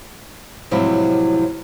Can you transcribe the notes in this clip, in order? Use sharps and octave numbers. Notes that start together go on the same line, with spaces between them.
A2 C3 F3 F#3 G#3 E4